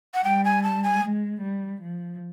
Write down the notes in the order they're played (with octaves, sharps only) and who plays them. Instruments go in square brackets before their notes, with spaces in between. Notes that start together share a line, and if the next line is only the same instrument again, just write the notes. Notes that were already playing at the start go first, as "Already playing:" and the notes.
[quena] F#5
[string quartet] G3 [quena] G5
[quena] G#5
A5
G#5
[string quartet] G#3
G3
F3